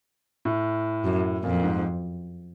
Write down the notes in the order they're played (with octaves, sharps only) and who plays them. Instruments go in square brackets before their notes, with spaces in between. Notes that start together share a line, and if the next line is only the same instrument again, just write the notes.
[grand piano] A2
[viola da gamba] F#2
[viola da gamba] F2 [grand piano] A#2
[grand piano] G#2